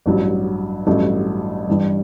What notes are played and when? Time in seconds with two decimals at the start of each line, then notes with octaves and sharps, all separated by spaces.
0.06 A1 G2 F#3
0.86 A1 G2 F#3 A3
1.67 G2 E3 G3